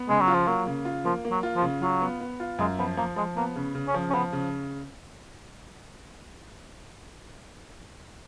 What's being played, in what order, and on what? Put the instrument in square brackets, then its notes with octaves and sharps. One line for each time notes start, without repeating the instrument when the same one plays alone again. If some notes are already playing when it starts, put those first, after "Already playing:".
Already playing: [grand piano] B3
[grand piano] C#3 [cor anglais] G#3
[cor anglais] F#3
[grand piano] F4
[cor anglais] F3
[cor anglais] F#3 [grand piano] A#3
[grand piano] C#3
F4
[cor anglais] F3 [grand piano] A#3
[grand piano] A#3
[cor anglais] F#3
[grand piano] F4
[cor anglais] F3
[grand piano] C#3
[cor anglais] F#3 [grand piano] F4
[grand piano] B3
B3
F4
[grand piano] F#2 [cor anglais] G#3
[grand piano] F3 [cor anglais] B3
[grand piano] F3 [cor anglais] A#3
[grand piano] F3 [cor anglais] G#3
[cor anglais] A#3 [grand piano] B3
[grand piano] C#3
C#3
[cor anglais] C#4
[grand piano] F3
[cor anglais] C#4
[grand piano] F3 [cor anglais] B3
[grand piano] C#3